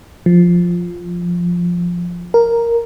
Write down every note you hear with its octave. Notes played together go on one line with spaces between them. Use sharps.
F3
A#4